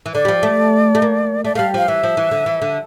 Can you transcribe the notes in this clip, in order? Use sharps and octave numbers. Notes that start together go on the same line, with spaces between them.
E3
D3 D5
G3
F3
A3
A3
A#3
A3 D5
G3 A3 F5
F3 F5
E3 E5
F3
E3
D3
E3
D3